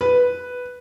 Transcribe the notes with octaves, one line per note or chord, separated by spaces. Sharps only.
B4